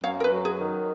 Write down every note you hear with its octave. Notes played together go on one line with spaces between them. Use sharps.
F#2 C#5 F5
A#4
B4
F#3
G#4
D#3